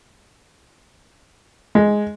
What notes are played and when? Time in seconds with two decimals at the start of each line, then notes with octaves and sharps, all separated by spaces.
1.75 G#3